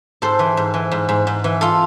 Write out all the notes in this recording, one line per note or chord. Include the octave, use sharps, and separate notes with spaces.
G#2 A4 C5
E3
G#2
E3
G#2
G#2
G#2
E3
F4 A4